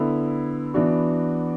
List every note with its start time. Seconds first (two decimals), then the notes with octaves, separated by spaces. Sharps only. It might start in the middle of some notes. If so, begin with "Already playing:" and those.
Already playing: D3 B3 E4
0.74 E3 B3 D4 F#4